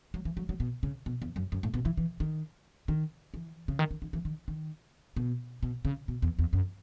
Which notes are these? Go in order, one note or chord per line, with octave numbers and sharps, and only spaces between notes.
F#3
E3
F#3
F#3
B2
C#3
B2
E2
F#2
F#2
A2
B2
E3
E3
D#3
D#3
E3
C#3
D#3
D#3
D#3
E3
D#3
D#3
B2
B2
C#3
B2
E2
E2
F#2